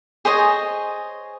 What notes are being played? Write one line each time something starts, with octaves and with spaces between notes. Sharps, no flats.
G#4 C5 C#5 D#5